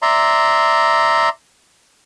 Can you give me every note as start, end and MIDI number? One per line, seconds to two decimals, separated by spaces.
0.02 1.29 74
0.02 1.29 76
0.02 1.29 82
0.02 1.29 84